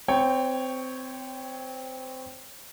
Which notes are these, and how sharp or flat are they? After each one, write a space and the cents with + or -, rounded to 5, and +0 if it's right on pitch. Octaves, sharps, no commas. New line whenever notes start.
C4 -20 C#5 +0 G5 +10